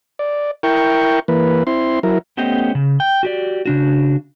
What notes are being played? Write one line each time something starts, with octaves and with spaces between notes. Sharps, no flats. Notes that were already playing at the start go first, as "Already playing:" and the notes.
D5
E4 A#4 G5 C#6
E3 A#3 B4
C4 E4 C6
F#3 E4 A#4
A3 B3 C#4 G4 C5 D#5
C#3
G5
F#4 G4 D5
C#3 D4 F#4